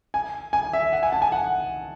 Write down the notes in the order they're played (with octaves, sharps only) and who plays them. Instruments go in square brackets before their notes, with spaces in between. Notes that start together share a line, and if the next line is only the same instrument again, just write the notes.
[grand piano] G#5
G#5
E5
F#5
G#5
A5
G#5
F#5